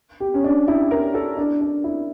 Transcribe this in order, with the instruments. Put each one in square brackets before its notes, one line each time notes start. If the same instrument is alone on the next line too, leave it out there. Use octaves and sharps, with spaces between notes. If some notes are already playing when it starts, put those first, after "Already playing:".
[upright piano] G4
C#4
D4
E4
A#4
A4
D4
D4
E4